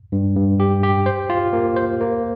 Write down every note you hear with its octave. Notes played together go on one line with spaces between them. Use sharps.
G2
G2
G4
G4
C5
F4
A#3
C5
A#3